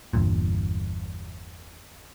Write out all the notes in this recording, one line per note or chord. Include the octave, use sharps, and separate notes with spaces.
G1 E2 G2 A#2